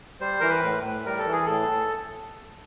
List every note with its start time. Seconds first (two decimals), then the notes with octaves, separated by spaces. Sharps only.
0.20 G3 C5
0.40 E3 A#4
0.49 B4
0.63 A2
0.84 A2
1.06 G3 A#4
1.18 A4
1.27 E3
1.32 G#4
1.46 A2 A4